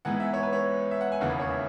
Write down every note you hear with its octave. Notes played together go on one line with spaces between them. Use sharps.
G#2 E3 G#3 B3 F#5
E5
C#5
B4
C#5
E5
F#5
G#5
E1 D#2 C#3 E3 F#5
B4
C#5
E5